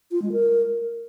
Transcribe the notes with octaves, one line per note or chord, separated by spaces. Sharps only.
F4
G#3
A#4